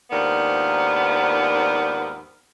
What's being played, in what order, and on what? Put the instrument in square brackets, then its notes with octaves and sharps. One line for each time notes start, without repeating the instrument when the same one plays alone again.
[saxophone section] D#2 G#2 F3 B3 D4 A#4